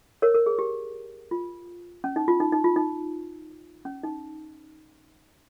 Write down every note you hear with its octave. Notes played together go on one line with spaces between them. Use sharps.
A#4 C#5
A#4
G#4
G4
F4
C#4
D#4
F4
D#4
D#4
F4
D#4
C#4
D#4